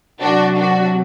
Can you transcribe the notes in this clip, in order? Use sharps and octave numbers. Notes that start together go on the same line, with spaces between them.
C3 F#3 D4 F#4
D4 F#4